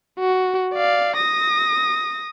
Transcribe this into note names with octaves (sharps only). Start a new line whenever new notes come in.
F#4
D5 F5
D#6 A#6